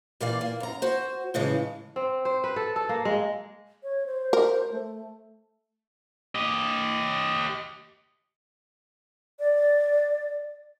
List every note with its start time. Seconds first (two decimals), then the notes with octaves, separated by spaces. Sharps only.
0.21 A#2 E3 A#3 D5 F5
0.41 A#3
0.60 F#2 A#5
0.82 F#4 C5
1.34 A2 C#3 E3 G#3
1.96 C4
2.25 C5
2.44 B4
2.56 A4
2.76 A4
2.89 A#3
3.05 G#3
3.83 C#5
4.06 C5
4.33 A#4
4.72 A3
6.35 G4 D#5
9.40 D5